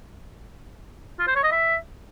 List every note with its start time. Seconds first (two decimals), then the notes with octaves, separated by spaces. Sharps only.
1.19 F4
1.27 C5
1.35 C#5
1.44 D#5
1.52 E5